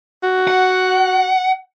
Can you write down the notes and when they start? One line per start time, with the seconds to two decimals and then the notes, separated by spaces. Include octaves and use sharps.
0.23 F#4
0.48 F#5